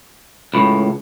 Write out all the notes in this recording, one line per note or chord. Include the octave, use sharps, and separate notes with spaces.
C#2 A2 B5